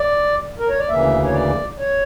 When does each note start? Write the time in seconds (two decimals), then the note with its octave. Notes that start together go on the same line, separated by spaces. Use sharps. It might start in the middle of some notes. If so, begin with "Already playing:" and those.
Already playing: D5
0.59 A#4
0.69 C#5
0.79 D5
0.89 D2 C#3 E3 A#3 E5
1.25 C#5
1.33 D5
1.79 C#5